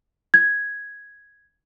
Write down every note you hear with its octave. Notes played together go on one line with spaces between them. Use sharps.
G#6